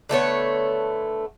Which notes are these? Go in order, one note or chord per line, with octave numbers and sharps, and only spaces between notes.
D3 A3 B3 C#5